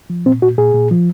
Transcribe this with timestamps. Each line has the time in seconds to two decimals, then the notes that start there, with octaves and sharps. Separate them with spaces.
0.10 F3
0.25 A#2 C4
0.42 A#2 F#4
0.58 A#2 G#4
0.74 A#2
0.91 F3